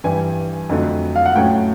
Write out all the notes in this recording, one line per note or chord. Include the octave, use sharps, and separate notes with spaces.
G2 E3 G3 G#5
F2 D3 F#3 A3
F5
F#5
A2 F#3 A3 C#4 G5